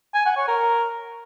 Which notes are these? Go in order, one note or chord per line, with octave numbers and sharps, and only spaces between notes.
G#5
F#5
C#5
A#4